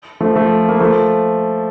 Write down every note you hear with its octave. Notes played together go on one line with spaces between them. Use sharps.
F3 A3
F3 A3
A#3
F3 A3